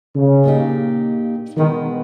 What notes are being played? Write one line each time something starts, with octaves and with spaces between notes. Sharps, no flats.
C#3
A#2 A#3 D#4 G4
B2 D#3 G#3 B3